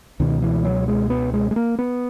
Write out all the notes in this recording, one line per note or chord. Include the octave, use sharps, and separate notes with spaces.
C#2 B2 D#3
E3
F#3
G#3
B3
G#3
G#3
A#3
B3